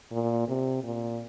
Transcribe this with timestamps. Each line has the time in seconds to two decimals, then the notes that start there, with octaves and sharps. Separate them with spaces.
0.12 A#2
0.48 C3
0.84 A#2